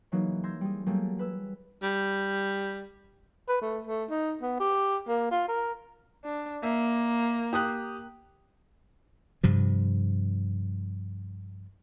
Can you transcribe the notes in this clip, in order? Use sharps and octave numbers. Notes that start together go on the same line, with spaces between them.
C#3 E3 F#3 A#3 D#4
C6 E6 G6 G#6 A#6 C7
G3 G#4
F#3 G3 A3 A#3 G4 G#4
G#4 B4 E6
G3
B4
A3
A3
D#4
B3
G4
A#3
F4
A#4
D4
A#3 E5
G4 D#6 F#6
G2 C3 F3